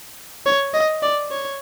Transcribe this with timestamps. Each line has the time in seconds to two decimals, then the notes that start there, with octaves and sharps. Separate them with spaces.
0.46 C#5
0.74 D#5
1.02 D5
1.31 C#5